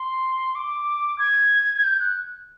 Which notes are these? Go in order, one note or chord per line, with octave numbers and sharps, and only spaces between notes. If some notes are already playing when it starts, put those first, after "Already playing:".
Already playing: C6
D6
G#6
G#6
G6
F#6